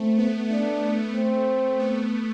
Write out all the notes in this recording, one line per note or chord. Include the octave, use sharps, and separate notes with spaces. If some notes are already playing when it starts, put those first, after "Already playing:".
Already playing: A3 C4
B3
A3 D4
A3 C4
B3